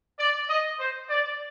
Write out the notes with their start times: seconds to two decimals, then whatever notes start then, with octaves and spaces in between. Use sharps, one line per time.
0.19 D5
0.49 D#5
0.79 C5
1.09 D5